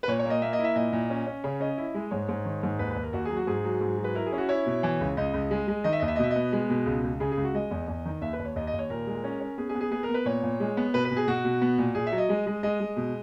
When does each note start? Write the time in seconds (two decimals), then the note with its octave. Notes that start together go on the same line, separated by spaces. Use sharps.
0.03 B4
0.08 A#2 C#5
0.19 C#5
0.25 A#3 D#5
0.42 A#3 E5
0.53 D#5
0.59 E4
0.64 E5
0.76 A#2 D#5
0.93 A#2
1.10 C#4
1.27 C#4
1.44 C#3 C#5
1.60 C#4 D#5
1.78 E4
1.95 G#3
2.11 G#2 C#5
2.29 G#2
2.45 D#3
2.63 G#2
2.79 D#2 B4
2.91 B4
2.96 D#2
3.03 A#4
3.13 D#2 F#4
3.25 F#3 G#4
3.36 F#4
3.47 G#2 G#4
3.64 F#3
3.81 G#2
3.98 F#3
4.04 B4
4.15 E4 A#4
4.26 G#4
4.32 C#4
4.38 F#4
4.49 E4 C#5
4.66 B2
4.83 E3
5.01 C#2
5.17 C#2 D#5
5.34 C#2
5.51 G#3
5.68 G#3
5.84 D#3 D#5
5.93 E5
6.00 D#2 D#5
6.08 E5
6.16 D#5
6.19 B2 E5
6.31 B3 D#5
6.52 G#3
6.70 B2
6.86 C#2
7.03 C#2
7.20 C#3 G#4
7.32 G#4
7.37 C#2
7.44 F#4
7.54 G#3 D#5
7.71 E2
7.88 E2
8.05 D#3
8.22 D#2 E5
8.33 B4
8.39 D#2
8.45 C#5
8.56 D#2 D#5
8.67 D#5
8.73 D#2
8.79 C#5
8.90 A#2 A#4
9.07 G#3
9.24 C#4
9.40 C#4
9.58 B3 G#4
9.69 G#4
9.75 B3
9.81 G#4
9.91 B3 G#4
10.03 A#4
10.09 B3
10.14 B4
10.25 A#2 C#5
10.43 A#2
10.60 G#3
10.77 B3
10.94 B2 B4
11.05 B4
11.11 B2
11.17 G#4
11.27 B2 F#4
11.45 B2
11.61 B3
11.78 A#2
11.95 A#2 G#4
12.07 E5
12.12 F#3
12.18 D#5
12.29 G#3
12.46 G#3
12.63 G#3 D#5
12.80 G#3
12.96 B2